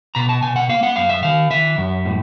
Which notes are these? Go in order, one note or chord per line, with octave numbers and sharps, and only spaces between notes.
B2 A#5
A5
B2 G#5
F#5
A#3 F5
F#5
F#2 F5
E5
D#3 F5
D#3 E5
F#2
A2